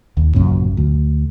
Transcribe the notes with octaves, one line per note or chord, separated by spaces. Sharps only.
D#1 D#2
A1 F#2 A#2 C#3
D2